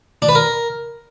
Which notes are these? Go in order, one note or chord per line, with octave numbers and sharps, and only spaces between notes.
D4
B4
A#4